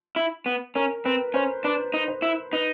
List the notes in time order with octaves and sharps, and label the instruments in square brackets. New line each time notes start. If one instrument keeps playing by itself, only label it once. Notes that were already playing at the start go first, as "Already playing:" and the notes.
[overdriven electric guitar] E4
B3
[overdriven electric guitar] C#4 [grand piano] A#4
[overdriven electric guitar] C4 [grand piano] B4
[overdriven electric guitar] C#4 [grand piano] C5
[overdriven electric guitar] D4 [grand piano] B4
[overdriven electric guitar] D#4
[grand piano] C5
[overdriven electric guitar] E4
[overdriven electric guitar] D#4 [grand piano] B4